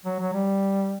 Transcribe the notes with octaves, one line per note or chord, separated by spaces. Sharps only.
F#3
F#3
G3